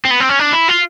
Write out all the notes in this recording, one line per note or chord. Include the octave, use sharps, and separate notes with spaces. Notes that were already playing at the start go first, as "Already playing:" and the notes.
C4
B3
C4
C#4
D4
E4
F4